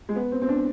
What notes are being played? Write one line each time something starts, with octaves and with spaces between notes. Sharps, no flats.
G#3
B3
C4
C4
D4